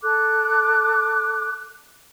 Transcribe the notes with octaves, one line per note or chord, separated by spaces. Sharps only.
A4 D6 F#6